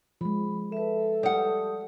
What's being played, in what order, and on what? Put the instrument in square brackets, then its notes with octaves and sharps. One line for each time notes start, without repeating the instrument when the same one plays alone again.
[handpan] F3 G#3 [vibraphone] B5
[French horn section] A4 [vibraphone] B4 E5
[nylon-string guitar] G3 F#5 [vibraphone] G4 D#6